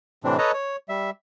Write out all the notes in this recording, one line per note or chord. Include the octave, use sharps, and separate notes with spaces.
A2 C3 E3 C4 D4
A4 B4 C#5 D#5 A5 A#5
C#5
G3 E5